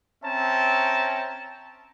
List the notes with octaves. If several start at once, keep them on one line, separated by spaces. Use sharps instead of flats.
C4 C#4 E5 G5 A5 A#5